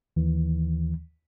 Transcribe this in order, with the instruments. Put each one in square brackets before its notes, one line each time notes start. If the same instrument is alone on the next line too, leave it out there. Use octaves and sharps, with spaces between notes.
[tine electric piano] D#2 D#3 E3